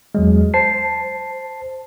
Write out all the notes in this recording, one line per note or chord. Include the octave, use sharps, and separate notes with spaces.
E2 F#3 G#3
C5 A5 C7